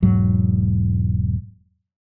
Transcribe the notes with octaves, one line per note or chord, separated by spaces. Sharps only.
E1 G#2 F#3